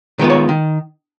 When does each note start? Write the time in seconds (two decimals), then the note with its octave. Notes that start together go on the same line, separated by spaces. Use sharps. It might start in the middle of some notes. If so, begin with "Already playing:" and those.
0.19 D#3 G#3 B3 F4
0.30 C#5
0.49 D#3